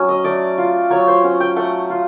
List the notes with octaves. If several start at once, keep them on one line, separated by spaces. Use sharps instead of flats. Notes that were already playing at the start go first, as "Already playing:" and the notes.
Already playing: F#3 C#4
D#5
A3 D5
F4
F#3 C#5
C5
C#4 F#5
G5
A3 F#5
F4